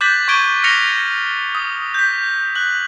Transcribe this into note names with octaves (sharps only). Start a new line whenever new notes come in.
D6 F#6 G6 A6 B6 F#7
C#6 D6 G#6 D7 D#7 G7
F6 A6 A#6 C#7 F7 G7
D#6
G6 B6
F#6 F#7